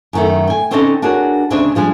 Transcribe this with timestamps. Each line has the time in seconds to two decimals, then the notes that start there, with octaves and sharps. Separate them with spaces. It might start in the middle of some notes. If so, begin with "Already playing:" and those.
0.13 F#2 D#3 A3
0.47 G5 G#5
0.71 D3 C4 C#4 D#4 A4 D#5
1.02 D4 F#4 G#4 A#4 C#5
1.50 D2 C#3 C4 D4 D#5 G#5
1.75 F3 G3 G#3 D4